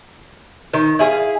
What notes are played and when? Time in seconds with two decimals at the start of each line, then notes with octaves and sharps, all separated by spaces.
0.74 D#3
0.99 E4 G#4 C5 F5